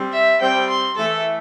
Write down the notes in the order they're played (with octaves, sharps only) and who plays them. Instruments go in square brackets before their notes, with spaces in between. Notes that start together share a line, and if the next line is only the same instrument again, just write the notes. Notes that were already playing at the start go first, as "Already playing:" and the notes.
Already playing: [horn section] G3 C4
[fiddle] E5
[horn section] G3 C4 [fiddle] G5
[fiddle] C6
[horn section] E3 A3 [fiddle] A4